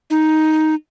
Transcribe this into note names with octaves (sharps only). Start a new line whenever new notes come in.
D#4